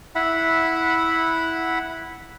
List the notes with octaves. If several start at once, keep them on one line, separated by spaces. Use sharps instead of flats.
E4 E5 F#5 B5